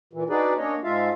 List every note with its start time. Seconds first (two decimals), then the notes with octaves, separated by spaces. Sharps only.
0.13 A#2 E3
0.30 D4 D#4 F#4 G#4 B4 D5
0.57 A#3 C#4 D4 C#5 D#5
0.84 G#2 G#3 F4 E5 F5 A5